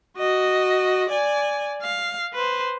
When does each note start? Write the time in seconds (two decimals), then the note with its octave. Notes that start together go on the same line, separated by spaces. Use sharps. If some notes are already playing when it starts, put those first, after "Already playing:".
0.17 F#4 D#5
1.09 D5 G#5
1.82 F5
2.34 B4 C5